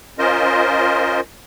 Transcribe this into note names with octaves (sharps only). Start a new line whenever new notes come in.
C#4 F4 A#4 C5 D#5